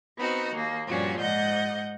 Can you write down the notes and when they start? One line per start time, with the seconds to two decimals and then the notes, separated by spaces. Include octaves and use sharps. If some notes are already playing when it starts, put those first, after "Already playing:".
0.16 B3 C4 D#4 F#4
0.52 D#2 A#3
0.87 G2 A#2 F3 G3 C#4 F#4
1.19 G#2 D#5 F#5 G6